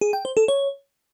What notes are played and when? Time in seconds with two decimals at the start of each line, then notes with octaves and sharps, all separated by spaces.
0.01 G#4
0.13 G5
0.25 C5
0.37 A4
0.48 C#5